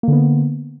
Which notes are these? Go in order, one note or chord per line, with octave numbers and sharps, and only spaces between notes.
D3 A#3 B3